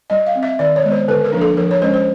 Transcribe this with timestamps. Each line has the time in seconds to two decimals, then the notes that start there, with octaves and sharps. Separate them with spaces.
0.10 G3 D#5
0.26 F5
0.35 C4
0.43 E5
0.59 D#3 D5
0.76 C#5
0.84 G#3 B3
0.92 C5
1.08 D3 B4
1.25 A#4
1.32 F3 A#3 D4
1.41 A4
1.57 F3 A#4
1.71 C#5
1.82 G#3 C#4 C5
1.94 C5